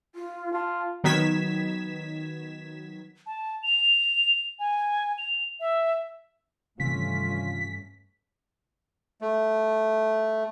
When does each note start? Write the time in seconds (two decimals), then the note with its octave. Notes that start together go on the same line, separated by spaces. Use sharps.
0.15 F4
0.54 F4 A5
1.04 D#3 F#3 B3 G#6 B6 E7
3.26 A5
3.63 F7
4.59 G#5
5.18 F7
5.60 E5
6.80 G2 C3 D#3 E3 A3 C#4 F4 B6
9.21 A3